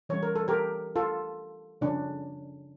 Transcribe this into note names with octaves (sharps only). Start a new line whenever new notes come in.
E3 G3 C#4 C#5
A#4
A4
G4 A#4
F4 A4
C#3 F3 C#4 D4